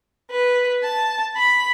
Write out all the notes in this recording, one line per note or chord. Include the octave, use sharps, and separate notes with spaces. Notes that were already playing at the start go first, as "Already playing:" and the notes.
B4
A5
B5